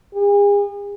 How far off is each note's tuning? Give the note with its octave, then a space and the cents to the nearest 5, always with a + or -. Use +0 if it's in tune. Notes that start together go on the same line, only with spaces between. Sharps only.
G#4 -40